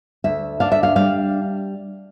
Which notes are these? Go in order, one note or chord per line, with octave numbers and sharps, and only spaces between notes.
D2 E5
D4 F5
E5
F5
G3 F5